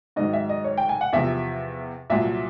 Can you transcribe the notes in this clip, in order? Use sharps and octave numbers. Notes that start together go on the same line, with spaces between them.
G#2 D#3 F#3 D#5
E5
D#5
C#5
G5
G#5
F#5
E2 C3 F3 E5
C2 A#2 F#3 E5